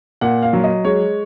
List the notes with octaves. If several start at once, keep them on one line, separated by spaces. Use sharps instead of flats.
A#2 F#5
F5
F#3
D#5
G#3 C#5